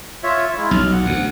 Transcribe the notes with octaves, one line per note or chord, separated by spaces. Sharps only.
F4 C#5 E5
G#3 E4 F4
B1 F6
F#5
D2